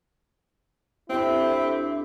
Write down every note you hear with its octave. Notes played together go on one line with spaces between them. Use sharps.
D2 D3 C4 E4 G4 E5